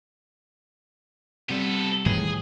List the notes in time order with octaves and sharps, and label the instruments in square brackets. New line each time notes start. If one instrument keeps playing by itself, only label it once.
[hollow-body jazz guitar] C3 G3 [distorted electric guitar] B3 A4
[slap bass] A2 D#3 E3 [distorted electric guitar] G#4